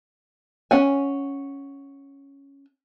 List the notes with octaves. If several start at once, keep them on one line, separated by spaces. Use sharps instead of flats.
C#4 F#5 G#5